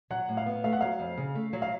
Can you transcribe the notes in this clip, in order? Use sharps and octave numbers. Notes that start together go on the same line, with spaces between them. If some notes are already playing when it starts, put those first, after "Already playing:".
F#3 F#5
A2
F5
B3
A3 F5
F#5
F#3 F5
F2
C#3
A3
F#3
F5